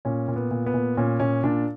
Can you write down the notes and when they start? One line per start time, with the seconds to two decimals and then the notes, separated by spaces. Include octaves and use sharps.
0.05 A#2 C#4
0.28 A#2
0.36 B3
0.51 A#2
0.66 B3
0.74 A#2
0.97 A#2 C#4
1.20 A#2 C#4
1.43 A#2 D4